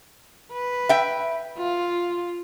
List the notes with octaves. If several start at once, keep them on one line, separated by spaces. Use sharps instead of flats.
B4
E5 G5
F4